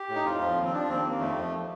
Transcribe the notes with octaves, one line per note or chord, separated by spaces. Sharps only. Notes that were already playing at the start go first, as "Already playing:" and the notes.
Already playing: G4
A2
D#4
F2 F4
F3
D#2
C4
F3 D4
D#2 C4
D#2 A#3
F2 A3
F3